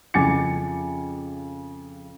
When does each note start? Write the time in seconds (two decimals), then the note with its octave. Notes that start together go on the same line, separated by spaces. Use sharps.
0.14 F2 C#3 G#5 D6 A6 C#7